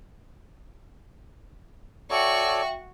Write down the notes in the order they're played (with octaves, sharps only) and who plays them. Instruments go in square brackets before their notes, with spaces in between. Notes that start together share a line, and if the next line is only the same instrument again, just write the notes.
[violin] F#4 C#6 [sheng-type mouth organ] A4 C#5 D5 [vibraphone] E5 G5